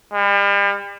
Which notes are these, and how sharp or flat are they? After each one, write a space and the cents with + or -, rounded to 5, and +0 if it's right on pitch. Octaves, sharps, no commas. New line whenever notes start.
G3 +40